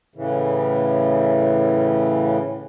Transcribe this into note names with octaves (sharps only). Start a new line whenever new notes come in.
A2 C#3 E3